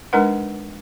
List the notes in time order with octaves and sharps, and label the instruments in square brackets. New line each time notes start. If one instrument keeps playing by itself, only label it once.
[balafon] G#3 D4 D#4 A#4 B4 F#5